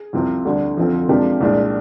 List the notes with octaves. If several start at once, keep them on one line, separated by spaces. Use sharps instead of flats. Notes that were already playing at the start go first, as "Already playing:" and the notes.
Already playing: G#4
C2 C3 F3 C4
D2 D3 G3 D4
F2 D3 F3 C4
C3 F3 G#3 D4 G4 A#4
C2 A#2 G#3 D4